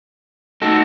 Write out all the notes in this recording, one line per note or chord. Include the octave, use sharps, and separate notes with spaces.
A3 D#4 F#4 A4